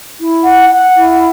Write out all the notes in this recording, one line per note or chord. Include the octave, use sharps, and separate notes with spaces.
E4
F#5
F#5
E4